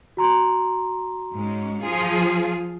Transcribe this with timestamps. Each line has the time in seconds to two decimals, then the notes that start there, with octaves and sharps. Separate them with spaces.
0.17 F#4 A#5 C6
1.33 G#2 G#3 C#4
1.80 F3 F4 G#4